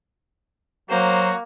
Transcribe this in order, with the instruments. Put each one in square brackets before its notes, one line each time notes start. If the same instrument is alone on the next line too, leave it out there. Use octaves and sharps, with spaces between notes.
[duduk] F#3 [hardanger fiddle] A#3 [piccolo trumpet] F#4 [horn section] C5